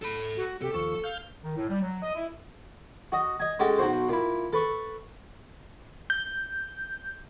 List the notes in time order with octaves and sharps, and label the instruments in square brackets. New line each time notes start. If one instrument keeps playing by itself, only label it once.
[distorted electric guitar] A4 B5
[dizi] F#4
[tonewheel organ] C3 [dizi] G4 [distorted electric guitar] A4
[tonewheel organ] D#2 F3 [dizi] C#6
[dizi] F5 [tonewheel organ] F6 G6
[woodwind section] D#3
A2
G3
F#3
D#5
E4
[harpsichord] F#4 D#5
D#5 G#5
G#3 C#4 F#4 G4 A4
B1 F#3 F#4 C5
A#2 E4
A4 B4 C#6
[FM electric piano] G6